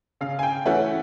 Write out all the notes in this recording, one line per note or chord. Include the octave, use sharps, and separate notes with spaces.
C#3 F5
G#5
G5
E3 A3 C#4 F#5